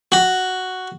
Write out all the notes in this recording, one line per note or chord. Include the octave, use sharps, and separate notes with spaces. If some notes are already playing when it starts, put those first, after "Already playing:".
F#4